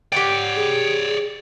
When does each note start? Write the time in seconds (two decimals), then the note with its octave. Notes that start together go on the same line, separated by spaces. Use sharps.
0.12 G4 C#5 D5 F#5 G5
0.56 G#4